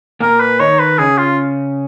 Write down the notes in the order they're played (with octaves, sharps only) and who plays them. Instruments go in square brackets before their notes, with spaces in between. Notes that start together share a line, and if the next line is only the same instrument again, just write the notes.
[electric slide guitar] A#2 A#3 [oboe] A#4
[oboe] B4
[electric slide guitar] D#3 D#4 [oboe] C#5
[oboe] B4
[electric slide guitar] C#3 C#4 [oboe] G#4
[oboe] F4